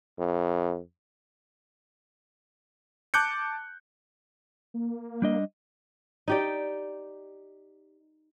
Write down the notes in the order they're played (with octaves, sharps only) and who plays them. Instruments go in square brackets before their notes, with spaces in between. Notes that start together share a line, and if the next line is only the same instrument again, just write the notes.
[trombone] F2
[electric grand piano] A5 D6 F#6 G6 C#7
[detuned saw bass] A#3
[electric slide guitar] G3 D4 D#5
[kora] D#4 G4 D5